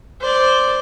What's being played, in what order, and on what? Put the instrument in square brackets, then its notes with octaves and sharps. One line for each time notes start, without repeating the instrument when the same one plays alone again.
[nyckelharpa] C5 D5